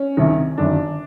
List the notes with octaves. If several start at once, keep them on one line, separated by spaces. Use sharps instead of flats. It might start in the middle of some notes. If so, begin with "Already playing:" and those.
Already playing: C#4
C2 C3 D#3
G1 F#2 D#3 D4